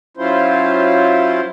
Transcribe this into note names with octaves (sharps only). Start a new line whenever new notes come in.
F#3 C#4 E4 F4 C5